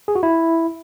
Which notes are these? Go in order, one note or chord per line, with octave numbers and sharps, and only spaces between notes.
G#4
F#4
E4